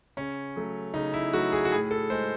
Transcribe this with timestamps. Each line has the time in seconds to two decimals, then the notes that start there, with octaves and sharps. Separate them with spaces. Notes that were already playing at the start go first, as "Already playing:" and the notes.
0.17 C#3 C#4
0.56 F#3 A3
0.94 C#3 D#4
1.14 E4
1.33 F#3 A3 F#4
1.52 G#4
1.65 F#4
1.72 A2 G#4
1.91 A4
2.10 G#3 C5